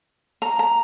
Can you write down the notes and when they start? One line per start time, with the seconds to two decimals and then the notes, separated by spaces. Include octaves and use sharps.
0.42 A#5
0.59 A#5